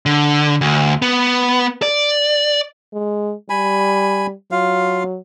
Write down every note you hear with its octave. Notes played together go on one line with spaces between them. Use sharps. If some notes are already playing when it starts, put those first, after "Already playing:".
D3
D2
B3
D5
G#3
G3 G#5 B5
F#3 F4 F5